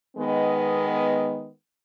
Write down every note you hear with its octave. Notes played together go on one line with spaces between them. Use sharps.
D#3 G#3 B3